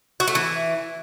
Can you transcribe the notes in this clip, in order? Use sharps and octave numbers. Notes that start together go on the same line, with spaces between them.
F#4
A3
E3